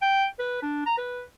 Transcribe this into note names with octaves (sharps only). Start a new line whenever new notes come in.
G5
B4
D4
A#5
B4